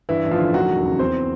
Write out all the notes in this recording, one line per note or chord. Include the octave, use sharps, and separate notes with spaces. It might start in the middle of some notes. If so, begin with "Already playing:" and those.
G2 E3 E4
A1
F3 F4
D3
D#2 F#3 F#4
E1
C#3
E2 C4 C5